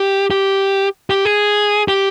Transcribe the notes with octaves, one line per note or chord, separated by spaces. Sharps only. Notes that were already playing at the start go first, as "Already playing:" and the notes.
Already playing: G4
G4
G4
G#4
G4